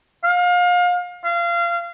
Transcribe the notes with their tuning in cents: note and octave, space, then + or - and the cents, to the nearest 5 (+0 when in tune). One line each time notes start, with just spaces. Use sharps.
F5 +30
F5 -25